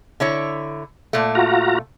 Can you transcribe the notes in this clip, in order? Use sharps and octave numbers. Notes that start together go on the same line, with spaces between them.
D3 E4 C#5
A#2 A3
F4 F#4 A#5